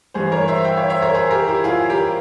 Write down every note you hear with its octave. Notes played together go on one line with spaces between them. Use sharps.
G2 E3 G#4 C5
A#4 C#5
C5 E5
E5 G5
C#5 F5
C5 E5
A#4 C#5
G#4 C5
G4 A#4
E4 G4
F4 G#4
G4 A#4